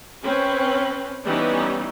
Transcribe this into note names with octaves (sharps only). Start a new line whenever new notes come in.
C4 C#4 B4
E3 G3 B3 C#4 D#4